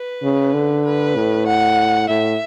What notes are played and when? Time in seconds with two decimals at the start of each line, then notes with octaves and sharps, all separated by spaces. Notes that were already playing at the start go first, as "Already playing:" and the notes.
Already playing: B4
0.23 C#3
0.54 D3
0.85 B4
1.16 A2
1.47 F#5
2.09 A2 E5